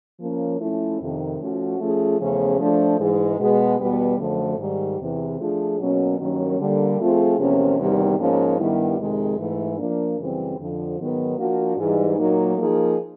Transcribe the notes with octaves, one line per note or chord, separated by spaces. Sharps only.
F3 A#3 C#4
F3 A3 C#4 E4
F2 C3 D#3
F3 A3 C#4 F#4
F3 A3 C#4 F4 G#4
E2 C#3 F3 A3 C#4
F3 A3 D4
G#2 E3 G#3
B2 G#3 B3
E2 B2 G3 B3
F#2 D3 F3 A3
G#2 D#3 G3
E2 C3 E3
F3 A3 D4 F4 G#4
B2 F#3 A#3 C#4
G2 D#3 F#3 A#3 C#4
D3 G3 A#3
F3 A3 C4 F4 G#4
E2 C3 F3 A#3 C#4
E2 C3 D#3 G3
G#2 F3 A#3 C#4
G2 D#3 G3 B3 E4
F2 C3 D#3 G#3
G#2 E3 A3
F3 A#3 D4
F#2 C#3 E3 G3 C4
F2 D3 F3
G#2 D#3 F#3 B3
F3 A#3 D4 F#4
G#2 E3 G3
A#2 F#3 A#3 D#4
F3 A#3 D#4 G#4